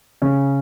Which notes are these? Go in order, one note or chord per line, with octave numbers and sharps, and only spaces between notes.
C#3 C#4